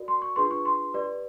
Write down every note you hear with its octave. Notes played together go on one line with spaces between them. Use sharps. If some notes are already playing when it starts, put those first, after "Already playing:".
Already playing: F#4 A#4 D5
C6
C#6
D4 F4 G#4 B4 C6
C#6
C6
G4 B4 D5